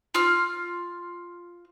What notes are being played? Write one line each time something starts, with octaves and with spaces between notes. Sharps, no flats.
F4 F6